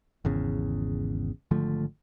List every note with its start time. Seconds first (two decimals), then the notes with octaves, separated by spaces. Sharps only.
0.25 G#1 E2 C#3
1.51 G#1 D3 F3 A3